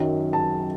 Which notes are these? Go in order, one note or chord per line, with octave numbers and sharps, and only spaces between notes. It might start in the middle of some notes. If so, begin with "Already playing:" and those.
Already playing: F#2 D#3 F#3
A5